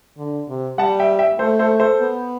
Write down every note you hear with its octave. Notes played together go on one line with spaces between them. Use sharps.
D3
C3
G3 F#5 A5
E5 G5
E5 G5
A3 A4 C5
A4 C5
A4 C5
B3